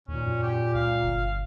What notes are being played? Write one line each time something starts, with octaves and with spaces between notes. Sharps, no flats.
D#2 A#2 C#4
F#2
G4
C#2 F5
G1